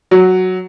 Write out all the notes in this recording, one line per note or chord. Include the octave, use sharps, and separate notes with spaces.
F#3